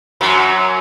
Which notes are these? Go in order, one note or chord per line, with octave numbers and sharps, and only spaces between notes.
F#2 F#3